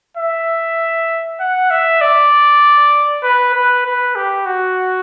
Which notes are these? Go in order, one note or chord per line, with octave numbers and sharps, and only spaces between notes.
E5
F#5
E5
D5
B4
B4
B4
G4
F#4